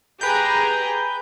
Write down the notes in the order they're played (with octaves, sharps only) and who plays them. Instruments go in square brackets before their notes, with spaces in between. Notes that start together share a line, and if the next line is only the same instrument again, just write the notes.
[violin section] G4 G#4 A#5 [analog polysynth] B4 G6